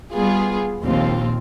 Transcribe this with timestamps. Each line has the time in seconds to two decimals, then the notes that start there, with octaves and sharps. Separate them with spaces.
0.11 G3 B3 F4 G#4
0.84 A#1 D#2 C4 F4